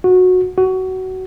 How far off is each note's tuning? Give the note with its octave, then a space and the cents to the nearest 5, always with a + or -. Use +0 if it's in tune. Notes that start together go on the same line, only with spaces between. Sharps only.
F#4 -15
F#4 +20